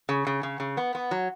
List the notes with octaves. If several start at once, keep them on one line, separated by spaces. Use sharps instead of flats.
C#3
C#3
C#3
C#3
B3
B3
F#3